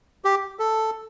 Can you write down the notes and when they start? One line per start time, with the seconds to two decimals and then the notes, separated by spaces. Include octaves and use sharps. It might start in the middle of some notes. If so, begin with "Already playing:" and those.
0.25 G4
0.59 A4